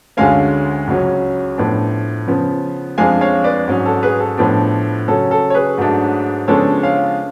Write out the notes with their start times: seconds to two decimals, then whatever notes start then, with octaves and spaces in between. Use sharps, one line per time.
0.17 D2 D3 G#3 C#4 F5 G#5
0.88 C#2 C#3 F#3 C#4
1.58 A2 F3 B3 D4
2.27 C#3 F3 B3
2.98 F2 F3 G#3 D4 F5 G#5
3.21 C#5 F5
3.44 B4 D5
3.68 G#2 F#3 C#4
3.85 A4
4.03 G#4 B4
4.20 A4
4.38 A2 F3 B3 D4
5.08 C#3 F#3 C#4 A4
5.31 A4
5.50 C#5
5.55 G#4 B4
5.78 G#2 F#3 A3 D4
6.48 C#3 F3 G#3 B3 D4 A4 C#5
6.83 C#5 F5